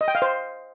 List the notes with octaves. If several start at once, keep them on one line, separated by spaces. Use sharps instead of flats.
D#5
G5
F5
C5